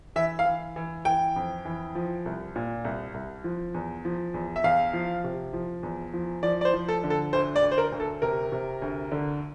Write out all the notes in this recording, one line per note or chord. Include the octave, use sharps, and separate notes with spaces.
E3 E5
F5
E3
E3
E3 G5
F2
E3
F3
C2
A#2
C2
C2
F3
E2
F3
E2
E5
E2 F5
F3
C3
F3
E2
F3
F3 D5
D5
C5
F3
A4
D3
A4
D2 C5
D5
D2
C5
A#4
D2
A4
C3 A#4
C3
D2
D3